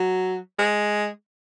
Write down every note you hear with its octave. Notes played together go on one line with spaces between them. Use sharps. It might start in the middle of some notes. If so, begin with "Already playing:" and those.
Already playing: F#3
G#3